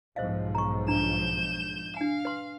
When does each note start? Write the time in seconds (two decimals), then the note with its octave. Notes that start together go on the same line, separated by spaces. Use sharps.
0.16 B1 G#2 F3 C5 D#5 F5
0.55 A#5 C#6
0.88 D4 A#5 G6 E7
1.97 D4 F5 G#5
2.25 B4 C6